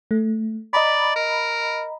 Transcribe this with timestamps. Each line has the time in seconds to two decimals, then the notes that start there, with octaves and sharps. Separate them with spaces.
0.11 A3
0.73 D5 D#5 A#5 B5
1.16 A#4